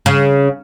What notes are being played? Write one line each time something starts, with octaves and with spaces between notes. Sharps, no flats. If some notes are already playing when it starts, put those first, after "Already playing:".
C#3